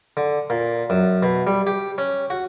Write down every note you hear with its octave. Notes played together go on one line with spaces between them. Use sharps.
D3
A#2
F#2
B2
G3
G4
C#4
F#4